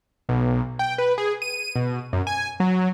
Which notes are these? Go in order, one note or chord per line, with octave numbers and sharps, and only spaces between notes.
B1
G5
B4
G#4
D#7
B2
F#2
G#5
F#3